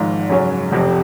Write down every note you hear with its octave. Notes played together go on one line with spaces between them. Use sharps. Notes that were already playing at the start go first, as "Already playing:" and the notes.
Already playing: G#1 G#2 F3
F#2 C#3 F#3 C#4
F1 F2 C3